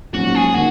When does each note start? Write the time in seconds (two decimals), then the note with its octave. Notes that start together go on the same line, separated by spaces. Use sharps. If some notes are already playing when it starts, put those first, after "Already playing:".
0.14 A#1 G#2 F#3 C#4 F#4
0.35 G#4
0.54 D#3 A#3 F#4